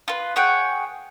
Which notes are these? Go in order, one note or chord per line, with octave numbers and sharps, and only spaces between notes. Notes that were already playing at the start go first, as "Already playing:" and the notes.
F4 B4
G#4 C#5 F#5 G5